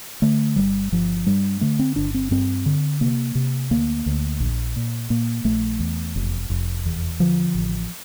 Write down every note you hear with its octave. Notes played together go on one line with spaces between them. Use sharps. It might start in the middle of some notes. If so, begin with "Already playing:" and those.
D3 A3
G1 G3
G1 F3
G2 G3
D3 A3
C4
G1 D4
C4
G2 C4
D3
C3 A#3
C3
D2 A#3
D2
A#1
A#2
A#2 A#3
A#1 A3
E2
F1
F1
E2
D3 F3
A1